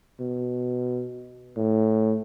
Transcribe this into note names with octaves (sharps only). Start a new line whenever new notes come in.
B2
A2